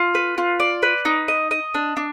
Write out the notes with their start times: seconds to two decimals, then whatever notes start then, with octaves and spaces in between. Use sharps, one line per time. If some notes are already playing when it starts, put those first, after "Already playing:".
Already playing: F4
0.15 B4
0.38 F4
0.60 D5
0.83 B4
1.05 D#4
1.28 D#5
1.51 D#5
1.74 D4
1.97 D4